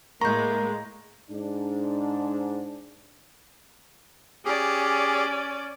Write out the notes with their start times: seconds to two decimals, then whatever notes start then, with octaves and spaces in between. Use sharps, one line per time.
0.21 A2 G#3 A#3 A#5 C#6 G6
1.31 G#2 D4
4.45 C#4 G4 G#4 D5